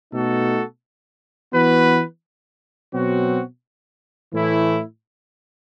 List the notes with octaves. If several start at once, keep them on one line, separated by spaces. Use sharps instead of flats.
B2 A3 D#4 F#4 A4
E3 B3 F#4 B4
B2 F#3 C4 F#4
A2 E3 A3 E4